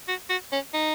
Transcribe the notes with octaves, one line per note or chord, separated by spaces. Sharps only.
F#4
F#4
C#4
D#4